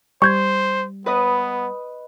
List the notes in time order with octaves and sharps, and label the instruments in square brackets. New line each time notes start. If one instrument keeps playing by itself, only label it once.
[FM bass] G3 [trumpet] C5 [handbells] C#6 G6 G#6
[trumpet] B3 [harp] B4 D#5